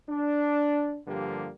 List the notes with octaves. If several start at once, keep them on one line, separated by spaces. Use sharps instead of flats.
D4
G2 D3 F3 G3 A#3 G4